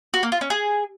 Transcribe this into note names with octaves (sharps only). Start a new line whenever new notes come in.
F#4
A#3
F4
C#4
G#4